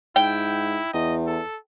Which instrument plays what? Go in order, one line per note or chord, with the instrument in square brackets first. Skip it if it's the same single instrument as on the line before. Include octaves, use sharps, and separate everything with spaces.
[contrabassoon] G#2 [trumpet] E4 [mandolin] G5
[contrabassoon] E2 [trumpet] D#5
[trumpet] A4